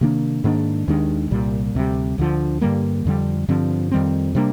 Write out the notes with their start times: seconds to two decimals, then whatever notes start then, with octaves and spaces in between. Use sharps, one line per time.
0.01 C3 D#3 A#3 D4
0.44 G#2 D#3 A#3 D4
0.88 D#2 D#3 G#3 D4
1.31 C2 A#2 G3
1.75 D2 C3 G3
2.18 D2 D3 F3
2.61 G2 D3 G3 A#3
3.05 F2 D3 G3
3.48 G2 D3 F3 C4
3.91 F2 D#3 G3 C4
4.35 C3 G3 A#3 D4